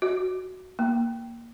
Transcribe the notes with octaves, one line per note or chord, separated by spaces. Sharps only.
F#4
A#3